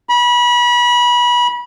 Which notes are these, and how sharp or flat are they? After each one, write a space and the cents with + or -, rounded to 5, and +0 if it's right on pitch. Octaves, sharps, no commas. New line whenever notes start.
B5 -30